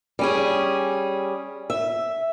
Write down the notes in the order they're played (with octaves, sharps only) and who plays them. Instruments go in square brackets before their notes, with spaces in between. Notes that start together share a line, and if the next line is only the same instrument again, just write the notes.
[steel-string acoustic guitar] G3 C#4 G#4
E5